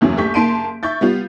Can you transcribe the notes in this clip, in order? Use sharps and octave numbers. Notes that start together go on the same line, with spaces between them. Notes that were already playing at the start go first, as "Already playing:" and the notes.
F#1 E2 F#3 C#4
A#1 A3 G4 C#6 G6 B6
F#1 A#3 A5 C6 D7 D#7
E5 C#6 G6 A6
G3 B3 F4